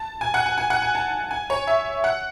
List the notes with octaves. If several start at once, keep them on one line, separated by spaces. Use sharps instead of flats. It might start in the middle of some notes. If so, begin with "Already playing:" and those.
Already playing: A5
G#5
F#5
G#5
G#5
F#5
G#5
A5
G#5
C#5
E5
F#5